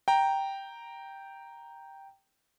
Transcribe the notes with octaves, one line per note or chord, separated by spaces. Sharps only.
G5 A#5